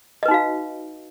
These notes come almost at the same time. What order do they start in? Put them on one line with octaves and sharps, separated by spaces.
D#5 B4 D#4 F#4 F5